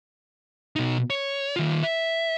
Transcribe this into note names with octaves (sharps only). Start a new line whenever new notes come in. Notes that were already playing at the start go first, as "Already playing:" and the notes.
B2 D#4
C#5
D#3 F4
E5